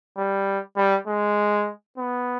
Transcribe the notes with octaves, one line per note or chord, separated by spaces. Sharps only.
G3
G3
G#3
B3